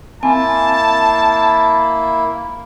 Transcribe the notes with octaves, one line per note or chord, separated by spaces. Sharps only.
A#3 C4 E4 G#5 A5